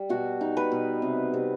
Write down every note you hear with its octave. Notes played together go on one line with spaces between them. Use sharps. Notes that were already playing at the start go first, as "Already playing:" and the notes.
Already playing: G3
B2 F#4
D#4
B4
B2
C3
C3